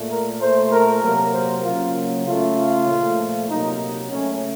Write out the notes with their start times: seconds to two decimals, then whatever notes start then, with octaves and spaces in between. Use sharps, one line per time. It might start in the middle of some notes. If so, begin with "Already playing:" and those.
Already playing: A#2 A3
0.10 A#4
0.40 A#2 A3 C5
0.71 A#4
1.02 C3 F#3 A#3 A#4
1.34 C5
1.64 C#3 F#3 A#3 F4
2.26 C#3 A3 F4
2.56 F4
2.87 A#2 F3 A3
3.48 C3 F#3 A#3 D#4
4.09 C#3 A3 C#4